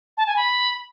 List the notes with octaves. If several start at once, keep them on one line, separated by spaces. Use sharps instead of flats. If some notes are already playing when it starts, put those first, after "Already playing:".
A5
G#5
B5